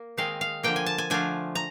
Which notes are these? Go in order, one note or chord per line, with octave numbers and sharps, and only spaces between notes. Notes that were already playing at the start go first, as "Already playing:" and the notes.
Already playing: A#3
D#3 G#3 C4 D#4 F5
F5
D3 F3 A#3 G5
G#5
A5
G#5
D3 F3 A3 D4 F4 G#5
A#5